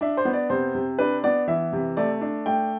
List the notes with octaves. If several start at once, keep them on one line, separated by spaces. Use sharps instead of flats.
D4 E5
C5
B3
D5
C3 C5
C3
D4 B4
B3 D5
E3 E5
C3
A3 D5
D4
A3 G5